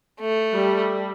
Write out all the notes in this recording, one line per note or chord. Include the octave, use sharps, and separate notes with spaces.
A3
G3 A4